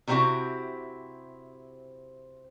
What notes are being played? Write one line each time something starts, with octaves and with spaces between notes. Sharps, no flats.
C3 G3 C4 E4 F#4 G4